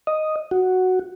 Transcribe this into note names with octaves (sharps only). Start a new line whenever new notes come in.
D#5
F#4